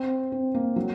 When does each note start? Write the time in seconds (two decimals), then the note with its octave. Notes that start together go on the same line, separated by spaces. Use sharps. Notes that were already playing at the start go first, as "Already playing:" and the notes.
Already playing: C4
0.32 C4
0.54 A#3
0.76 F#3